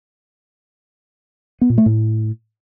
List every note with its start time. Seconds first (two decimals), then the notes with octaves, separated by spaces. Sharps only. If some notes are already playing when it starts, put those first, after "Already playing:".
1.61 B3
1.70 A#2
1.78 A3
1.86 A2